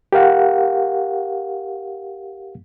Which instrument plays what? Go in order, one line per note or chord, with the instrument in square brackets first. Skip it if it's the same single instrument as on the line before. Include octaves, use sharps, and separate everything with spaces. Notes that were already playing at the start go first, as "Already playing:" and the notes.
[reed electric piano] G4 A#4 F5 F#5